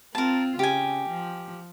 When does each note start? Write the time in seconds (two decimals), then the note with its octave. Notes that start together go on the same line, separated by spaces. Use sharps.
0.15 C4 F4 A#4 A5
0.59 C#3 G4 G#5
1.09 F3